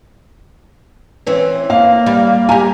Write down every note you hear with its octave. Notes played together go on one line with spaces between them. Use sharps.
E3 C4 C#4
A#3 F5
G3
G4 G#4 G#5 A#5